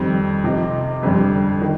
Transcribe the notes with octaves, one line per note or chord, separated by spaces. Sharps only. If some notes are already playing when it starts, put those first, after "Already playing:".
Already playing: F2 D#3 G3 C4
C3 F3 C4 D#4
F2 D3 G3
D#3